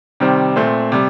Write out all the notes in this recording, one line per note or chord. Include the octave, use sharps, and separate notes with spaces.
C3 D#3 G3 C4
A#2 A3 C4
C3 G3